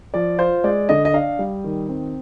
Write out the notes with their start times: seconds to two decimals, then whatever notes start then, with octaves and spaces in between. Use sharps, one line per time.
0.14 F3 D5
0.38 F4 C5
0.64 G#3 D5
0.89 D3 D#5
1.05 D#5
1.13 D4 F5
1.39 G3
1.64 D#3
1.89 C4